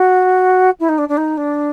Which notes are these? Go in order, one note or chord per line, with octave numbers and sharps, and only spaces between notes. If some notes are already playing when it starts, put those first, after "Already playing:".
Already playing: F#4
E4
D#4
D4
D4
D#4
D4